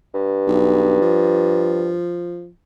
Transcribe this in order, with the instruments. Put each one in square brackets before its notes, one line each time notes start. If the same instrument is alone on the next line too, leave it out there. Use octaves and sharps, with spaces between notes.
[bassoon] G2
[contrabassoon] B1
F3